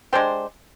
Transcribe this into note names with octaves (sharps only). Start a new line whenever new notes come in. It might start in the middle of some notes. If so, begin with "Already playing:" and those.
G#3 D4 G4 C5